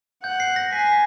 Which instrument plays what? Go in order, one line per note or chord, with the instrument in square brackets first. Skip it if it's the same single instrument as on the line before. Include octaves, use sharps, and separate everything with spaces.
[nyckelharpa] F#5 [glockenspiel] G6
[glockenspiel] C7
A#6
[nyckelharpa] G#5 [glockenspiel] B6
[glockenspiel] C7
B6